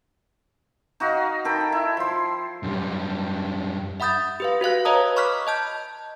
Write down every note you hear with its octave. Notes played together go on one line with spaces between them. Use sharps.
D#4 F#4 D#5 F5
D#3 A4 G5 B5
E4
F3 C6
F#2 G3
E5 F#5 B5 D#6 G6 A6
G4 B4 F5
F#4 B4 F5 F#6
B4 C#5 D#5 A5 A#5 D#6
B5 C#6 D6 F6 F#6 B6
D#5 A5 G6